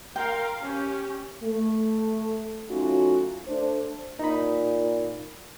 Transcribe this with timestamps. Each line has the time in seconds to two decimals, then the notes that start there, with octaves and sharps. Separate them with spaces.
0.16 A#4 F5 G5 C6
0.62 C#4 G4
1.44 A3
2.70 F#3 A3 C#4 D#4 F4 F#4
3.48 A3 D4 C5
4.19 A#2 D#4 B5